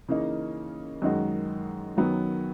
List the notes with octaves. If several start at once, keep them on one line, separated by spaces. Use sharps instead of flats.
C#3 E3 A#3 D#4
F#2 D#3 G#3 D#4 F#4
F#2 D#3 F#3 B3